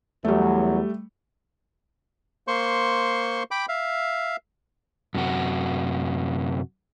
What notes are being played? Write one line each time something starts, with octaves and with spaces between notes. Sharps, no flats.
E2 F#3 G3 A3
A#3 C5 C6 C#6
G5 B5 D6
E5 F5
F#2 C3 F#4